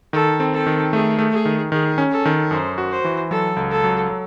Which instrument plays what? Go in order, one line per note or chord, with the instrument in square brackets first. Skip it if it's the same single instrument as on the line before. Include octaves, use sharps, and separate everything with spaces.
[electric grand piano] D#3 [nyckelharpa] A4
[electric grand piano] C4
[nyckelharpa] A4
[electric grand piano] D#3
[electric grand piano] A3 [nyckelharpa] G#4
[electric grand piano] A3
[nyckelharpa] G#4
[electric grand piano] D#3
[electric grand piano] D#3 [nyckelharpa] G#4
[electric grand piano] C#4
[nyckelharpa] A4
[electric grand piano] D#3
[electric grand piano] F#2 [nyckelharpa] C5
[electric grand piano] F#4
[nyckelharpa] C5
[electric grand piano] E3
[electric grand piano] F#3 [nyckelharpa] A4
[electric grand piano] C#2
[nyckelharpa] A4
[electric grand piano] F#3
F#3